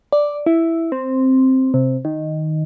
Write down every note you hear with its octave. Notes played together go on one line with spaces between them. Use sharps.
D5
E4
C4
C3
D#3